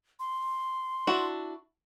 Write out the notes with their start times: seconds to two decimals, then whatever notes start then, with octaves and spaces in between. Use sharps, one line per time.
0.19 C6
1.07 D4 E4 F#4